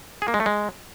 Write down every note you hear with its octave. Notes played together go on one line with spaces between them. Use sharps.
G#4
A#3
G#3
A3
G#3